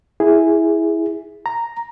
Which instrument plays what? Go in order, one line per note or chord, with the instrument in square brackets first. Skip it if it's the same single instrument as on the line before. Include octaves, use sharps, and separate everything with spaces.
[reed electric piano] E4 G#4
A#5